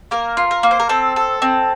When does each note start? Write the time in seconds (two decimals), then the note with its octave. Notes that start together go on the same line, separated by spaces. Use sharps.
0.11 A#3 A#4
0.37 F4
0.51 A#4
0.63 A#3
0.71 C5
0.80 A#4
0.89 C4 A4
1.16 A4
1.42 C4